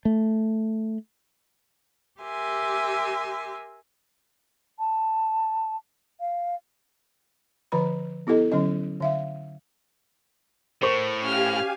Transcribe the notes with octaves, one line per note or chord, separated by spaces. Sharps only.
A3
G4 A#4 E5 G#5 C6
A5
F5
D3 F3 B4 A#5 B5
B3 E4 G4 A4 D#5
D3 F#3 C#4 D#5
D3 E5 F5
A2 A#4 C5 C#6
C#4 G4 F5 G#5 F6